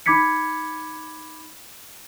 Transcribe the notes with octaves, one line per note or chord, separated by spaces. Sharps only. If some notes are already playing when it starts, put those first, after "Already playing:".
D#4 B5 D6 G#6 B6 C#7